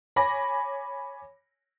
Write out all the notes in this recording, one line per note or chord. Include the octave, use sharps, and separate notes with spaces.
C#5 G#5 B5 D6 A#6